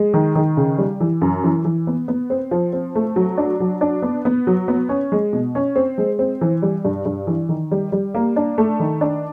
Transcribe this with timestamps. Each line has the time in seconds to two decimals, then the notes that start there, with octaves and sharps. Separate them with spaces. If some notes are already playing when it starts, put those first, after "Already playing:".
Already playing: G#3
0.14 D#3
0.35 D#3
0.57 C#3
0.78 G3
1.00 E3
1.21 F#2
1.44 E3
1.65 E3
1.87 B3
2.08 B3
2.30 C4
2.51 F3
2.73 C4
2.95 A3
3.16 F#3
3.37 D4
3.60 F#3
3.81 D4
4.02 B3
4.25 B3
4.47 F#3
4.68 B3
4.89 C#4
5.12 G#3
5.33 B2
5.55 C#4
5.76 C4
5.98 G#3
6.19 C4
6.41 E3
6.62 G3
6.85 G2
7.05 G2
7.27 E3
7.49 D#3
7.71 G3
7.92 G3
8.14 A#3
8.36 D4
8.58 A3
8.80 D#3
9.01 D4